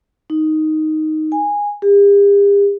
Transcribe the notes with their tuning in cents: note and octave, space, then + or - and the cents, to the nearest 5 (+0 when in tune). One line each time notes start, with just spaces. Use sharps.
D#4 +0
G#5 -15
G4 +45